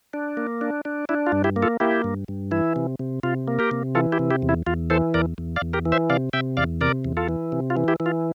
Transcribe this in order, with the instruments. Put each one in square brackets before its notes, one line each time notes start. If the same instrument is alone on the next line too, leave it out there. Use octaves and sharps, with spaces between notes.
[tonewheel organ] D4
A#3
D4
D4
D4 E4
F4
G2
E4 G4
A#3
F4 A4
A#3 E4 G4
G2
G2
E3 E4
C3
C3
C3 F4
A#3
G4 A#4
C3
E3 F4 A4
E4 G4
C3
E4 G4
E2
E4
E2 F4
E3 A4 C5
E2 A#4 D5
E2
D5 F5
E2
G4 A#4
E3
C5 E5
C3 D5 F5
C3 E5 G5
E2 D5 F5
C3 A#4 D5
E2
F4 A4
E3
C3
F4
E3
E4 G4
E3
F4